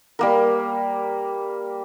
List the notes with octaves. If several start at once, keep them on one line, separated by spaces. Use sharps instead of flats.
G3 A#3 A#4